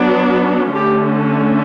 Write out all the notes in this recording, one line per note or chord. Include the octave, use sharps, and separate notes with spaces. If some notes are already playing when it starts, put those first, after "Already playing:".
Already playing: F#3 B3 D4
D3 A3 C#4 G4